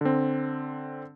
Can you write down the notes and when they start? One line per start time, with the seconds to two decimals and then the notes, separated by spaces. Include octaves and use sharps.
0.01 D3 C4